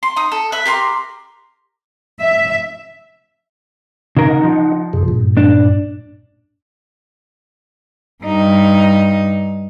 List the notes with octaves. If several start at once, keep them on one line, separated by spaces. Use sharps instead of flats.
C6
D#4 D#6
A4
B4 E5
G4 A#4 C6
E5
C#3 D#4 A#4 D#5 F#5
F3
F#2 C3 G#4
G2 A#2
D4
G2 D#4